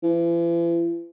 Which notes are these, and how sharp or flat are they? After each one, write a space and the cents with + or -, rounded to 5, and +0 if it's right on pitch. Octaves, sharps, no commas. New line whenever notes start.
E3 +45